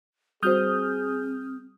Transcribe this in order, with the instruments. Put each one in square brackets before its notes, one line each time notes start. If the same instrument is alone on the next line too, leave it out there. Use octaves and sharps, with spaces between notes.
[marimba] G3 F#4 C5 [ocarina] C4 [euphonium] G#4 [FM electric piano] D#6 F6 G6